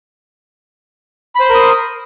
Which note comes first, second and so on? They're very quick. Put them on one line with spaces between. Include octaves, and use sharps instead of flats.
B5 C5 C6 A#4 D#6